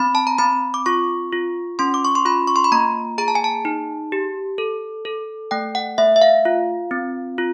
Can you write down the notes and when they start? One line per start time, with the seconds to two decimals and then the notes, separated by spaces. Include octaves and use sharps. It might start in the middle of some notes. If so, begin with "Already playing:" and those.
Already playing: C4 B5
0.15 A5
0.27 A#5
0.38 C4 B5
0.74 D6
0.86 F4 C#6
1.33 F4
1.79 C#4 C6
1.94 D6
2.05 C#6
2.15 C6
2.25 F4 B5
2.47 C#6
2.56 C6
2.64 B5
2.72 A#3 A#5
3.18 G#4 A#5
3.28 A5
3.35 G#5
3.44 A5
3.65 D#4
4.12 G4
4.58 A4
5.05 A4
5.51 A3 G5
5.75 F#5
5.98 A3 E5
6.16 E5
6.22 F5
6.45 F4
6.91 C4
7.38 F4